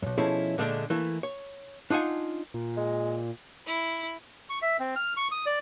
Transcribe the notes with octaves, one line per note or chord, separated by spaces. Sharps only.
B1 F#2
B2 F3 C#4 E4 G#4 A4
A#2 D3 G#3 A3 C#4 D4
E3 A3 A#3 E4
C#5
D4 D#4 F4 F#5 G#5
A#2
G#3
E4
C#6
E5
C4
F6
C#6
D#6
D5